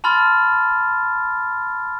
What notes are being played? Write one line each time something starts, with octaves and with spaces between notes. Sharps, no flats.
A5 B5 C6 F6 A6